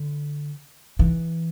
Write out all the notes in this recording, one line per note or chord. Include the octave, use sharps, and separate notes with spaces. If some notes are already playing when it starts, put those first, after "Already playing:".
Already playing: D3
E3